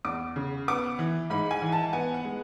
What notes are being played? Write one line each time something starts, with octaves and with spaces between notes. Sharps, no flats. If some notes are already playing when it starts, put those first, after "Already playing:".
E2 D6
C#3
B3 D6
E3
G#2 B5
G#5
E3
A5
B3 G#5
F#5
G#3